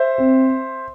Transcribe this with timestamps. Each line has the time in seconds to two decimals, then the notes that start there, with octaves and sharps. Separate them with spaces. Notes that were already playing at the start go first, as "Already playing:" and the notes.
Already playing: C5 E5
0.18 C4